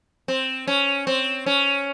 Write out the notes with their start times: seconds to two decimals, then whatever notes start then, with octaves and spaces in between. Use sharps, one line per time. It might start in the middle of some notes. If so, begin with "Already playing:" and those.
0.28 C4
0.67 C#4
1.07 C4
1.46 C#4